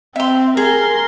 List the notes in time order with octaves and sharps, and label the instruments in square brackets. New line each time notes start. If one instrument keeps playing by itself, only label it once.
[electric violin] C4 [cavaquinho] E5 C6
[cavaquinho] G#4 [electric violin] A#4 C6